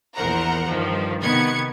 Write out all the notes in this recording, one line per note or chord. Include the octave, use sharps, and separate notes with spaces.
A#1 E2 A#4 C5 F#5 A#5
G2 D#3 F3
C3 D#3 B3 G#6 C#7